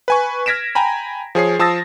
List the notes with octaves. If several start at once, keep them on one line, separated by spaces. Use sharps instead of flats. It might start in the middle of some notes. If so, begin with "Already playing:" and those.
B4 G#5 C#6
F6 G#6 A#6 B6 D7 E7
G5 G#5 A#5 B5
F3 G#4 C#5 C7
F3 A5 D#6 E6 A6 A#6